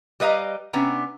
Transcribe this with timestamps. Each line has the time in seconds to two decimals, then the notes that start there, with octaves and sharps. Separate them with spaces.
0.20 G3 B4 D#5 F5 A#5
0.73 C3 B3 C#4 D4 A#5